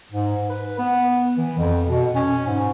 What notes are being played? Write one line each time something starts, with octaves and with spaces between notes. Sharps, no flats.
G#2
B4
B3
E3
F2
B2
C#4
G#2